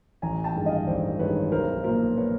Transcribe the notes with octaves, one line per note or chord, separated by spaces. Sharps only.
A1 G#5 A#5
G5 A5
G2 D#3 G#3
D#5 F5
A1 C5 D5
G2 D#3 G#3 B4 C#5
B1 A#4 C5
A#2 F3 A#4 C5
B4 C#5